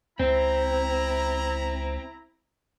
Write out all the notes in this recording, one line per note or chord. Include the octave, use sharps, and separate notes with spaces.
C#2 C4 E4 A#5